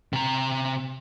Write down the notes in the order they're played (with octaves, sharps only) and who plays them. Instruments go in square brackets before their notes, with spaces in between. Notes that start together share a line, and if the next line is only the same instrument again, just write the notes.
[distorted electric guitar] C3 A#5